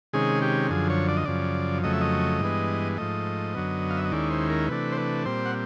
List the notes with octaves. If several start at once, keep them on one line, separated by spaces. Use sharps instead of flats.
C3 D#3 G#3 C#4 G#4
G4
F#2 D3 F3 G#4
C#5
D5
D#5
F#2 C#3 F3 D5
F2 C#3 F#3 A3 D#5
E5
D#5
G2 E3 G#3 B3
G#2 F3 A3 D#5
F#2 D3 F#3 B3
F5
E5
D#5
D#2 D#3 G#3 C#4 E4 D5
C5
A#4
C3 E3 A3 D4 B4
C5
B4
A#2 G3 C4 C5
F#5